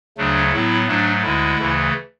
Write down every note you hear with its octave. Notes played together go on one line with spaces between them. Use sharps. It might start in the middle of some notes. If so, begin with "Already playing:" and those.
D2 C#3 F#3 A3 D4
A2 F#3 B3 E4
G#2 F#3 A3 D4
D2 D3 G#3 E4
D2 C#3 E3 A3